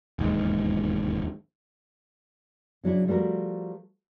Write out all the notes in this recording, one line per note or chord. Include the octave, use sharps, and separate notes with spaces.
E1 D#2 G#2
C#3 F#3 D4 E4
F3 G3 A3 F#4 A#4